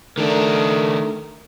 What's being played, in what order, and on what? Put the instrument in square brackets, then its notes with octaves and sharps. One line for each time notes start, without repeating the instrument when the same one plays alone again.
[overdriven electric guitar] D#3 D4 [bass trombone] A3 [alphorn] A#4